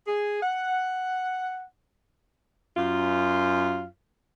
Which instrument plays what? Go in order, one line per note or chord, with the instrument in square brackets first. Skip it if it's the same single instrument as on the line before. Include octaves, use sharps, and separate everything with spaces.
[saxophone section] G#4
F#5
[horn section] F#2 F4